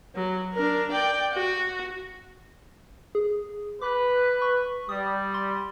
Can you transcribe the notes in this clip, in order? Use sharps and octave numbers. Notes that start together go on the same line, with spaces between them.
F#3
D4 A#4
D5 G5
F#4
G#4
B4 D6
C#6
G3 D#6
C6